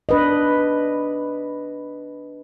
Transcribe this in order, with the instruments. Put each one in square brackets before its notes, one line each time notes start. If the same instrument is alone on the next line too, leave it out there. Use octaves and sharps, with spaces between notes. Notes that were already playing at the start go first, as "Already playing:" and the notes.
[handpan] D4 B4 D#5